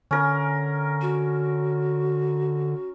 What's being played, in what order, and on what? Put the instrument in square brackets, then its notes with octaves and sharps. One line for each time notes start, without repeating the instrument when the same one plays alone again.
[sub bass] D3 [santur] C#4 A#4
[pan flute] F#4